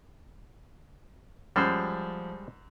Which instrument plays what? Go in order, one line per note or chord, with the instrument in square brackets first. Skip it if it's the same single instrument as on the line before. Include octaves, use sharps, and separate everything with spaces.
[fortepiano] F#2 [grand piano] F3 [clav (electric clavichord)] G3 G#3 C5